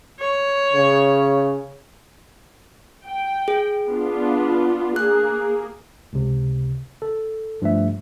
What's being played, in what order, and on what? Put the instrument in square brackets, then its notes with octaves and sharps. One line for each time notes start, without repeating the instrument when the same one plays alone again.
[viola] C#5
[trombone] C#3
[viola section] G5
[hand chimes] G#4
[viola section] B3 D4 F4
[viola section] A#3 G#4 [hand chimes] F#6
[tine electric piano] C#2 C3
A4
G2 F3 A3 E5